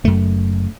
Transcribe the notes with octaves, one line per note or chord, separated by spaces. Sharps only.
F#1 F#2 A3